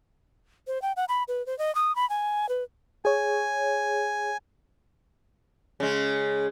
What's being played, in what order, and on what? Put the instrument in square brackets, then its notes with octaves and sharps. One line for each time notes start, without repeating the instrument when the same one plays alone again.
[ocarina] C5
G5
F#5
B5
B4
C5
D#5
D#6
B5
G#5
B4
[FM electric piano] G#4 C#5 [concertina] G#5
[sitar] C#3 G#3